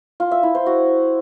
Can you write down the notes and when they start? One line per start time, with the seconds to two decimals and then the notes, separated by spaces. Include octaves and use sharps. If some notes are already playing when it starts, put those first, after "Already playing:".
0.20 F4
0.31 E5
0.43 E4
0.55 C5
0.66 F#4